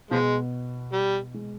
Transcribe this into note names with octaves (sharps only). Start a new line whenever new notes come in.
B2 F3 G#3 B3
G3
G#3